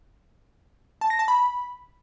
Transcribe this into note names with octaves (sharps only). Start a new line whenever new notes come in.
A5
A#6
A5
B5